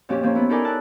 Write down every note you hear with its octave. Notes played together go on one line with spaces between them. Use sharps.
F2 A#2 C4 C#4 G4
F3 A#3 C4 C#4
B3 E4
D#4 E4 A4 A#4 D5 G#5
A5 E6 F#6